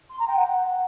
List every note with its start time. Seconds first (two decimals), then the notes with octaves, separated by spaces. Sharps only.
0.10 C6
0.19 A#5
0.27 G5
0.36 F#5